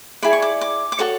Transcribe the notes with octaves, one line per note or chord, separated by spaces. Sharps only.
E4 G#4 D5 B5
C#6
D6
D6
D6
F#4 A4 C#5 C#6